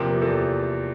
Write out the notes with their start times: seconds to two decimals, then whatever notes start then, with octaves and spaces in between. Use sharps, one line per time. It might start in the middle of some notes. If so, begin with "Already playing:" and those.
Already playing: E2 C3 F3 A#3 G4
0.22 E2 A4